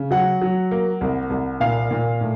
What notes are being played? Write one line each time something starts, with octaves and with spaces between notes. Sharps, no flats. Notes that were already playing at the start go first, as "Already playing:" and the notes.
Already playing: C#3
F#3 F#5
F#3
A#3
C2
C2
A#2 F5
A#2
A2